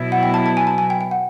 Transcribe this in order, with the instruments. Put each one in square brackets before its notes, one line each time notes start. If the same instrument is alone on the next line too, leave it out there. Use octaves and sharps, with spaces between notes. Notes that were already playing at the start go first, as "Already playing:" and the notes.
Already playing: [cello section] B2 F#3 B3 E4
[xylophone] F#5
G5
A5
A5
G#5
A5
G#5
G5
G5
F#5